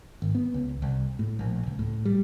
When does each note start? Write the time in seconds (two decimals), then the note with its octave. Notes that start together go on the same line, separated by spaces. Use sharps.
0.22 G#1
0.35 B3
0.54 C#2
0.82 C2
1.19 A2
1.39 A#1
1.67 C#2
1.79 A2
2.05 G3